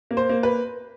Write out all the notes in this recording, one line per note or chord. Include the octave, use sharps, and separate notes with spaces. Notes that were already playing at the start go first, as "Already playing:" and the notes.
A#3
C5
A#3
B4